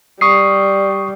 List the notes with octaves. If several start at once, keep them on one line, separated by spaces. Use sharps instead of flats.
G3 C#6 D#6 C7